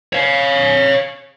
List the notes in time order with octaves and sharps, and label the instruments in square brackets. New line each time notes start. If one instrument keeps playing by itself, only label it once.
[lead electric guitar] C#5 F5